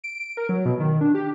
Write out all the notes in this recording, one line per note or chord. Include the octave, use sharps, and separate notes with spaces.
D7
A#4
F#3
B2
D#3
D4
G4